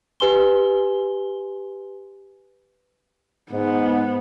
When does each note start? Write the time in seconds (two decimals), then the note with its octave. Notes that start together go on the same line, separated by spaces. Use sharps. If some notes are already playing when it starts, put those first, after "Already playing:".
0.20 G4 B4 G#5 C6 G7
3.51 G#2 B3